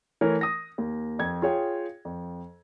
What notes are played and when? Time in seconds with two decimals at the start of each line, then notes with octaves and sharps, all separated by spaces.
0.21 E3 A3 A#4 C#5
0.41 D#6 A#6
0.78 D#2
1.19 F2 G#6
1.42 F4 G#4 C#5 G5
2.05 F2